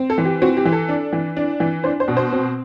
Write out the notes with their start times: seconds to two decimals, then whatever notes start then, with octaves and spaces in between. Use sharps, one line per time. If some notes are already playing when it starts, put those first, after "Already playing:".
Already playing: C4
0.10 A4
0.18 E3
0.25 G4
0.42 C4 F#4
0.57 G4
0.65 E3
0.72 A4
0.89 D4
1.13 E3
1.37 D4
1.60 E3
1.84 D4 C5
2.00 C5
2.08 B2
2.17 C5
2.33 C4